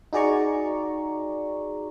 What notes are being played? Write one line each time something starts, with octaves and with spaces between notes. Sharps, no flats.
D#4 F#4 G#4 D5 A#5 C#6